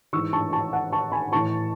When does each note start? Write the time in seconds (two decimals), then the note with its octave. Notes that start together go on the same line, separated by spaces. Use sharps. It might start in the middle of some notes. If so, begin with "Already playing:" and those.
0.13 G#2 E3 C#6 E6
0.33 A5 C#6
0.52 A5 C#6
0.73 F#5 A5
0.92 A5 C#6
1.12 G#5 B5
1.32 A2 E3 A5 C#6